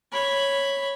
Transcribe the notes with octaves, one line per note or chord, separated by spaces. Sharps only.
C#5 B5